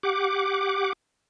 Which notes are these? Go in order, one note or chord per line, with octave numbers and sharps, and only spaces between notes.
G4 F#5 D6